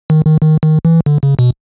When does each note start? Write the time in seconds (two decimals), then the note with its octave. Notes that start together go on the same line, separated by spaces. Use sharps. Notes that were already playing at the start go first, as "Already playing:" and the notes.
0.10 D#3
0.26 D#3
0.42 D#3
0.63 D#3
0.85 E3
1.06 D3
1.23 C#3
1.39 B2